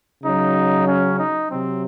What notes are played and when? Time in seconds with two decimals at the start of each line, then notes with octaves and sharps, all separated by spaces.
0.23 C#3 F#3 D#4
0.86 C#4
1.18 D#4
1.50 C3 F#3 C4